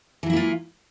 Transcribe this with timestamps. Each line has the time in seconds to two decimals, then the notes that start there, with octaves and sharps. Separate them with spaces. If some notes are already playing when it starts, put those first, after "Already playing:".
0.23 E3
0.26 F#3
0.30 E4
0.33 A#3
0.36 F4